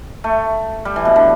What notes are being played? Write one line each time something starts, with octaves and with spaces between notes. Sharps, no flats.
A3
G3
E3
B2
D3